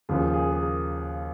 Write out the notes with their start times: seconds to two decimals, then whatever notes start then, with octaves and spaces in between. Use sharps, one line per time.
0.09 D#2 C#3 F3 G#4
0.34 G#4
0.53 G#4
0.59 A#4